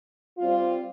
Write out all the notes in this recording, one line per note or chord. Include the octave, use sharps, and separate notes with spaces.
G3 C4 F4